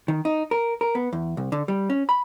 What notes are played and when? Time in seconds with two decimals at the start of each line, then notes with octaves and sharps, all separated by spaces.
0.08 D#3
0.25 D#4
0.51 A#4
0.81 A#4
0.95 B3
1.13 E2
1.37 C2
1.52 D3
1.68 G3
1.90 C#4
2.09 B5